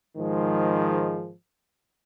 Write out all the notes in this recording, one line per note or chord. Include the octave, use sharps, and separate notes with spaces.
G#2 D#3 F3 G#3